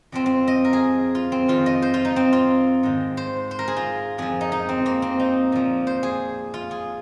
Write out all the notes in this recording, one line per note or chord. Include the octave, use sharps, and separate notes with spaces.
F2 F3 C4
C4
D#5
A#4
G#4
F4
C4
F2 D#3 F4
D#5
C5
F4
D#4
C4
F4
G#2 D#3
C5
C5
A#4
G#4
F4
F2 F3 G#4
D#4
D#4
C4
A#3
C4
D#4
A#2 F3
C5
G#4
F4
G#4